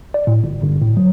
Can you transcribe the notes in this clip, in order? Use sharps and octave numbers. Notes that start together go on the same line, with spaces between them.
D5
A2
G1
G1
A2
F#3